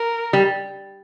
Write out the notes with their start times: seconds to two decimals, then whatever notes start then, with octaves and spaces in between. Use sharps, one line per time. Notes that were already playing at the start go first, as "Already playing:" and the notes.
Already playing: A#4
0.33 G3